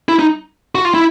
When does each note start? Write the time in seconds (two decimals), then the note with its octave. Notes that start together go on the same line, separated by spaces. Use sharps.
0.09 E4
0.19 D#4
0.75 F#4
0.85 F4
0.94 E4